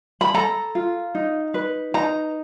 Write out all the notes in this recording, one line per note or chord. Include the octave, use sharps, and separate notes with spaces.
B5
A4 A#5
F4
D#4
B4
D#4 A#5